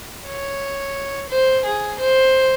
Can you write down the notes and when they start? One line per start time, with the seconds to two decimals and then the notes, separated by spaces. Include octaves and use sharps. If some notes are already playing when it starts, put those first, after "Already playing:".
0.26 C#5
1.29 C5
1.64 G#4
1.99 C5